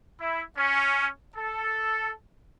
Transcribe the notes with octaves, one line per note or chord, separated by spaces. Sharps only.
E4
C#4
A4